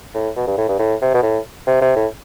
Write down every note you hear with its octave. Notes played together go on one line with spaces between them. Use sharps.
A2
B2
G2
A2
G2
A2
C3
B2
A2
C3
C3
A2